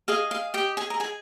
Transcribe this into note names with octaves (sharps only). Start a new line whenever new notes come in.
G#4 D#5 F5
F5
G4 G5
G#4 G#5
A#5
G#4 G#5